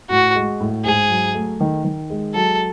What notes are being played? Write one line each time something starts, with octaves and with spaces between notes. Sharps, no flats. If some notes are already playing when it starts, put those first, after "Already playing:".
A2 F#4
G#3
A2
G#2 G#4
F#3
A3
D#3
D#3
G#3
F#3 A4